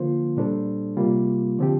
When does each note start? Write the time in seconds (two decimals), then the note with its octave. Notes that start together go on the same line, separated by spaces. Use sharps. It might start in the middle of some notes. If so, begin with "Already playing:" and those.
Already playing: D3 F3 A#3 F4 C5
0.37 A#2 G3 D4 A4 C5
0.97 C3 G3 A#3 F4
1.58 D3 F3 C4 G4